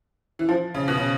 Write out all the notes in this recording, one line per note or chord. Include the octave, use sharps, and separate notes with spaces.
E3
F3
C#3
B2
C#3